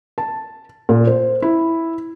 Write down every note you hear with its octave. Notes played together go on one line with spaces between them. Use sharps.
A5
A#2
C5
E4